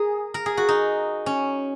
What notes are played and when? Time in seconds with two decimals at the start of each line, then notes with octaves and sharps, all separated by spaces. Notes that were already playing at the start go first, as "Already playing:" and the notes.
Already playing: G#4 A#4
0.34 A#4
0.46 G#4
0.57 F#4
0.69 D#4
1.26 C#4